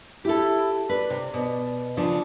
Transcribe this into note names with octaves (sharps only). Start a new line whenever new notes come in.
E4 G4 A4
B4 D5
C3
B2
C#3 F3 D4